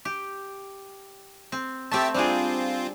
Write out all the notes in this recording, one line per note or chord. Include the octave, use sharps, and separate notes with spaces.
G4
C4
A3 C4 G4 E5 A5
G3 C4 D4 F4 G#4